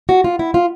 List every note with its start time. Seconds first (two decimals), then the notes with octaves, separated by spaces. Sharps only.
0.09 F#4
0.24 F4
0.39 E4
0.54 F4